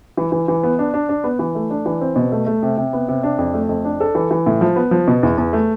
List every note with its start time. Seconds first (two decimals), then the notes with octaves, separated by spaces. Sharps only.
0.17 E3
0.32 E3
0.48 E3
0.63 B3
0.79 D4
0.94 D4
1.09 D4
1.24 B3
1.39 E3
1.55 A3
1.71 D4
1.86 E3
2.01 C4
2.16 B2
2.32 A3
2.46 A3
2.63 C3
2.78 C3
2.93 B3
3.09 C3
3.23 D4
3.39 F2
3.54 A3
3.69 F2
3.85 D4
4.00 A4
4.15 E3
4.31 E3
4.46 A2
4.61 F3
4.76 B3
4.91 F3
5.08 B2
5.23 E2
5.38 E2
5.53 A3